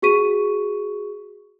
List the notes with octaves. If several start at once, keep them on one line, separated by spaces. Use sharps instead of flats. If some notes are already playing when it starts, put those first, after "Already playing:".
F#4 G#4 C#6 B6 D#7